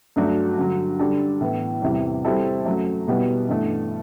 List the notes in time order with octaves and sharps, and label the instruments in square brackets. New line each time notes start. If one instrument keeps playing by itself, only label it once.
[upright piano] G2 F#3 A3 D4 F#4
G2 D3 F#3
D3 G3 D4 A4
A2 E3 B3
E2 C3 E3 G3
G3 C4 E4 A4
F#2 F#3 A3
B2 G3 B3 E4
G2 E3 A3